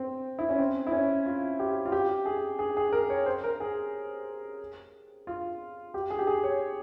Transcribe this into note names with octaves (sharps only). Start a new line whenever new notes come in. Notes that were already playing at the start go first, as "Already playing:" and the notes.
Already playing: C4
E4
C#4
C4
E4
C#4
F4
G4
F4
G4
G#4
G#4
G#4
A#4
C#5
C5
A#4
G#4
F4
G4
G#4
G4
G#4
C#5